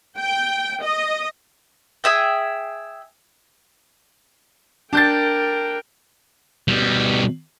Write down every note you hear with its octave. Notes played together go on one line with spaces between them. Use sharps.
G5
D#5
G#4 E5 G5
D4 A#4 G5 G6 A6
B2 G3